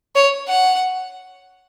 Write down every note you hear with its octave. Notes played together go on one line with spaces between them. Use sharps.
C#5
F#5